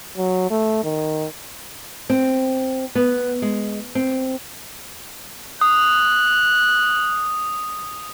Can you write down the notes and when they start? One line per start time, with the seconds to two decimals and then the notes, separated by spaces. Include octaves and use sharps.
0.17 F#3
0.50 A3
0.84 D#3
2.10 C4
2.95 B3
3.42 G#3
3.95 C4
5.61 D#6 F#6